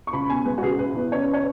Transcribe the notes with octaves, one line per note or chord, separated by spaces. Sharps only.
C#6
C#2 B5
B2 G#5
G#3 B4
F#4
C#2 G#4
F#1 B4
E2
C#3 C#5
B4
C#5